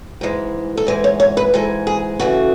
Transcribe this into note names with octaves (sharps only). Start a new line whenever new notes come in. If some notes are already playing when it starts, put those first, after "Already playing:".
G#2 E3 G#3
A4
G#2 E3 G#3 B4
C#5
C#5
B4
G#2 E3 G#3 A4
G#4
C#3 E3 A3 F#4